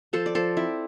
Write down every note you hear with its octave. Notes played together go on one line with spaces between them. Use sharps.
F3 A4 C5
D5
F3 A4 C5
C4 E4